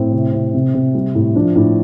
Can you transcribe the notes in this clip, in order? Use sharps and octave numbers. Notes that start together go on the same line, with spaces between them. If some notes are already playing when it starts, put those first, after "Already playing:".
Already playing: A2 C4
C3
C3
C3
C3
G3
A2
F3 D4
A2 D4